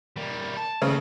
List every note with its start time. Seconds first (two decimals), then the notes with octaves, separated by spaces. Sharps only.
0.17 G3 A#3
0.57 A5
0.82 D#2 C#3 A3